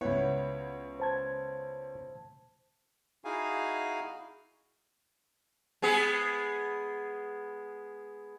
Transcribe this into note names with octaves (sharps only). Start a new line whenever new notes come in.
C#2 B3 E4 C#5 F#5
C5 A5 G#6
D#4 E4 F#4 G#4 F5 G#5
G#3 B3 G#4